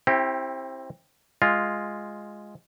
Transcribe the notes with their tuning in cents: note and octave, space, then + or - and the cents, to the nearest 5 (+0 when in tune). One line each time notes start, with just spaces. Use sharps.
C4 +25 E4 +0 G4 -5
G#3 +0 F4 +0